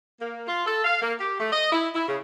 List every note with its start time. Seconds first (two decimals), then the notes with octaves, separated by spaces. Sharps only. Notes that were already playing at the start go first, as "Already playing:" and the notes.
0.20 A#3
0.48 F4
0.66 A4
0.84 F5
1.02 A#3
1.20 G4
1.40 A3
1.52 D#5
1.72 E4
1.95 E4
2.08 C#3